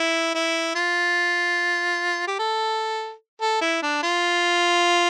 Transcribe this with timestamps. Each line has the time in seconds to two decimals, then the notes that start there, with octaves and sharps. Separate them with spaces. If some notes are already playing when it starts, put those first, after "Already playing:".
Already playing: E4
0.35 E4
0.75 F4
2.27 G4
2.39 A4
3.41 A4
3.61 E4
3.83 D4
4.03 F4